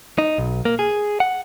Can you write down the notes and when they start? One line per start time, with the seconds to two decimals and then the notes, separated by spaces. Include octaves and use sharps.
0.18 D#4
0.38 B1
0.65 A#3
0.79 G#4
1.20 F#5